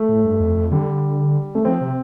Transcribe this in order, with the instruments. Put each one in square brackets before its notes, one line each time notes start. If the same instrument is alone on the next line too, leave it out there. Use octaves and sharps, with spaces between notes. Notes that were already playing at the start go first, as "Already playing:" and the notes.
Already playing: [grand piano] A3
[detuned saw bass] A2
G2
F2
F2
[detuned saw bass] D3 [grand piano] G3
[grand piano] A3
[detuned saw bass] F3 [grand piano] C4
[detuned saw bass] C3